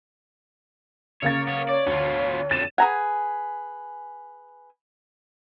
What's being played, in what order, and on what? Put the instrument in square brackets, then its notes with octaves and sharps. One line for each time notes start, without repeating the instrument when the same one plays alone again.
[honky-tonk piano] C#3 A#3 A6 [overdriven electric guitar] C#5
[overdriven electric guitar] B3 C#5
[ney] C#5 [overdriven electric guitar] D5
[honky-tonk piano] D2 [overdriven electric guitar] B3 F4
[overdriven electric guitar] F2 D3 [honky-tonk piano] A6 D#7 E7
[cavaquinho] G#4 B4 G#5 [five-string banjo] F#5 A#5